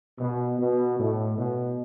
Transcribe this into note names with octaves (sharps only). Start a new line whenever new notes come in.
B2
B2
A2
B2